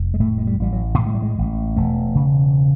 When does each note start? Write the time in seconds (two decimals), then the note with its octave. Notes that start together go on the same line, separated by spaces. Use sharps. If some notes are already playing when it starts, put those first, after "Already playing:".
Already playing: F1
0.14 G#3
0.20 A2 A3
0.38 G#3
0.47 G3
0.60 A1 G3
0.73 F#3
0.98 A2 A3
1.06 G#3
1.14 G3
1.22 G#3
1.38 A1
1.76 E1 A3
2.15 C#3